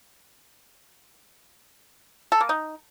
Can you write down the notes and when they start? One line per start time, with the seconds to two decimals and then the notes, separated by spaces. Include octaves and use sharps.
2.32 A4
2.41 A#3
2.49 D#4